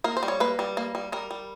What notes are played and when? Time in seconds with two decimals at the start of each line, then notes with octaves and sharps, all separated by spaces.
0.04 A#3 A#4
0.17 C5
0.23 G3
0.28 C#5
0.40 A#3 B4
0.59 G3
0.77 A#3
0.95 G3
1.12 G3 A#4
1.31 G3